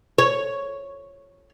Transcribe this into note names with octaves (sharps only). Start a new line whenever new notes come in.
C#5